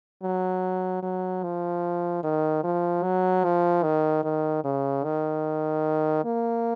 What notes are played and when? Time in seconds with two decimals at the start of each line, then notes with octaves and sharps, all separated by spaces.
0.23 F#3
1.03 F#3
1.43 F3
2.24 D#3
2.64 F3
3.03 F#3
3.44 F3
3.83 D#3
4.24 D#3
4.65 C#3
5.04 D#3
6.25 A#3